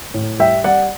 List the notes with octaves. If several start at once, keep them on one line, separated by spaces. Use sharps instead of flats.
A2
G3 E5 G5
G3 D5 F#5